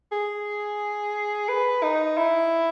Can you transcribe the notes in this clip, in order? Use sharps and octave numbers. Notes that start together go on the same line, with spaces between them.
G#4
B4
D#4
E4